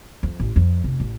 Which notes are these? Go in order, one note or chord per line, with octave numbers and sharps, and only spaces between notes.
F2
A1
F2
F1
A1